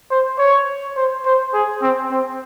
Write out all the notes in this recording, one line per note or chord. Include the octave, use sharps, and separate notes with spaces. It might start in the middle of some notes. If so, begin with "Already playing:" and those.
C5
C#5
C5
C5
G#4
C4
C4